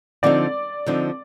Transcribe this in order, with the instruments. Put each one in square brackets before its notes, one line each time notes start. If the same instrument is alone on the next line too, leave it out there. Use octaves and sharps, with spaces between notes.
[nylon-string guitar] D3 F3 C4 D#4 [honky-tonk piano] D5
[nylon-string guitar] D3 F3 C4 D#4